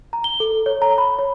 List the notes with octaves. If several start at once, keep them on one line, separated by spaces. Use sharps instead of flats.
A#5
G7
A4
C#5
A#5
B5
C#5